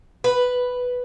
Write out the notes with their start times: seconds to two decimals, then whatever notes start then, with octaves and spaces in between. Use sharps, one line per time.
0.24 B4